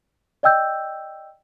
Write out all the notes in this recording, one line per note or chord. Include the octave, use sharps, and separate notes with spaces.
D5 D#5 G5 E6 G6